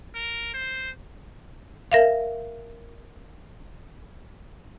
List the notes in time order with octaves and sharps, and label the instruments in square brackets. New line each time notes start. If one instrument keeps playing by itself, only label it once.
[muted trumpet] A#4
C5
[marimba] A#4 E5 F5